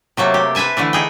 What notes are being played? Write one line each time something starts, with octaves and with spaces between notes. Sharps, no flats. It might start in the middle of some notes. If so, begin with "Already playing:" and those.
C3 F#3 A3 A#3
G4
B4 C5 E5 G#5 A5
D3 E3 A3 D4
D#4 G#4 G5